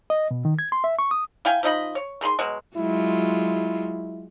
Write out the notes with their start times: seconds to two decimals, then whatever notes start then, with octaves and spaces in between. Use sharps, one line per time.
0.10 D#5
0.31 B2
0.45 D#3
0.59 G#6
0.72 C6
0.84 E5
0.99 C#6
1.11 D#6
1.45 E4 F5 G5 G#5
1.63 F3 D#4 D#5 B5
1.95 C#5
2.21 D#3 G#4 B5 C6
2.39 B2 F#3 G#3
2.77 F#3 G#3 E4 F4